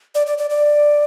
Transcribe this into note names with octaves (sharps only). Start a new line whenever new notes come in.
D5
D5
D5
D5